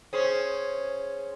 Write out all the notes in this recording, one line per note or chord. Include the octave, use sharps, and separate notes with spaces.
C#4 G#4 C5